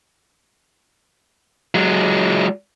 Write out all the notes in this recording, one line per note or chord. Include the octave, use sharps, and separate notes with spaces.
F#3 G#3